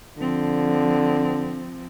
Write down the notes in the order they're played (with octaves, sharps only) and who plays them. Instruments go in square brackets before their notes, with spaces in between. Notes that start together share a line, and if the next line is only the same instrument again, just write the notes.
[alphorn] D3 [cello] F3 C4